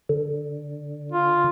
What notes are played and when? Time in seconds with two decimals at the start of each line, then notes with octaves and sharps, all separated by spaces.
0.09 D3
1.12 F4